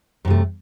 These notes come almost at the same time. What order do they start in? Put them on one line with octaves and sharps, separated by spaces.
F#2 C3 A3